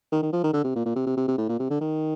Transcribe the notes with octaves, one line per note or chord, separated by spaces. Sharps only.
D#3
D#3
F3
D#3
D3
C3
A#2
A#2
C3
C3
C3
C3
A2
A#2
C3
D3
D#3